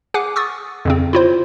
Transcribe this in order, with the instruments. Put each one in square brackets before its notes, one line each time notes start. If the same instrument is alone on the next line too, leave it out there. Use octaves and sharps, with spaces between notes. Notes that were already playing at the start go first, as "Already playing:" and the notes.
[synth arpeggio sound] G#4 F#5 G#5 D6 F#6
C#6 D#6 E6 A6
F2 C#3 C4
E4 F4 C5